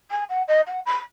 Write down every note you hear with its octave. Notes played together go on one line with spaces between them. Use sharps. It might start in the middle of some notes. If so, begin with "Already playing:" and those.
G#5
F#5
D#5
F#5
B5